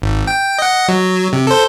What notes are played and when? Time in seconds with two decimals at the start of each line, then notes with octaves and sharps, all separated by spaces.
0.02 G#1
0.27 G5
0.59 D#5 F#5
0.88 F#3
1.33 C3
1.47 A4 C5